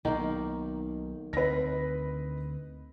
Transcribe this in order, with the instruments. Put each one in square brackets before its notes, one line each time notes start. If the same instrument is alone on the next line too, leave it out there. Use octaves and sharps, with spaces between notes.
[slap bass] B1 [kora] D#3 A#3
[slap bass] D2 C4 [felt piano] B4 D#5 A#6